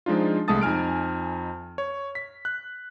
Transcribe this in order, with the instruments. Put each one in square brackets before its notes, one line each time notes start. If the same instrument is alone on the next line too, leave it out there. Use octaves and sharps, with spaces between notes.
[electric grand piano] F3 G#3 D4 D#4 F4
C2 G#3 A3 A5 D#6 A6
F2 D#4 G#5 F6 D7
C#5
B6
F#6